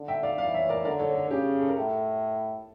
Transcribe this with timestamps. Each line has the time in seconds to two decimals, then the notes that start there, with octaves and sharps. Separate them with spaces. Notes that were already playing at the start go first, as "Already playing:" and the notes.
Already playing: D3
0.08 E5 G5
0.23 D5 F5
0.38 E3 D5 F5
0.54 C#5 E5
0.69 A#4 D5
0.85 D3 A#4 D5
0.99 A4 C#5
1.15 A4
1.30 C#3 G4
1.61 A4
1.69 A#4
1.77 A2 A4